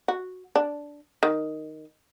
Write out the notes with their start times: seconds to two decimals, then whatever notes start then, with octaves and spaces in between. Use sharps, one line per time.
0.08 F#4
0.56 D4
1.23 D#3